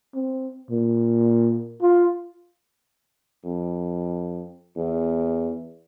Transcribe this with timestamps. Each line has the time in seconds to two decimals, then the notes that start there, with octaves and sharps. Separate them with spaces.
0.15 C4
0.71 A#2
1.82 F4
3.44 F2
4.76 E2